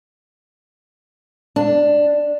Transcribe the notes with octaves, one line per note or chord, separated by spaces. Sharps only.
D4